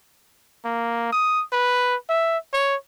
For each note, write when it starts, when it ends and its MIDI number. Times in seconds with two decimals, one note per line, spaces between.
0.65 1.08 58
1.12 1.43 87
1.53 1.96 71
2.09 2.38 76
2.53 2.76 73